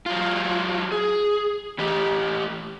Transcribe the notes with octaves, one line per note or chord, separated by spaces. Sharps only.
F#3 F4
G#4
A2 E3 G4